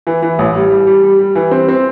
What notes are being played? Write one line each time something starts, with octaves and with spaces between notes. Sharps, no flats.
E3
E3
A1
G3
G3
G3
G3
G3
E3
C4
C4